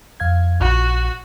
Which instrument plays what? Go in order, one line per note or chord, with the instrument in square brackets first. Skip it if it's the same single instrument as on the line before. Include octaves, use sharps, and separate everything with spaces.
[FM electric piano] F2 F5 G#6
[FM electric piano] A#1 [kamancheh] F#4